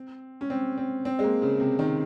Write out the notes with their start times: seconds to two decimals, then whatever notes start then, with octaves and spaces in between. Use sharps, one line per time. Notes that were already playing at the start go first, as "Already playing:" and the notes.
Already playing: C4
0.41 C#4
0.50 C4
0.78 C4
1.05 C4
1.19 G#3
1.24 A#3
1.42 C#3
1.60 C3
1.79 D#3